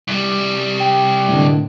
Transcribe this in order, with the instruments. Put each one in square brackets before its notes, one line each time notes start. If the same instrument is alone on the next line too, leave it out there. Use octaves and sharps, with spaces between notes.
[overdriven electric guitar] C2 G3
[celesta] G5
[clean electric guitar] A2 D3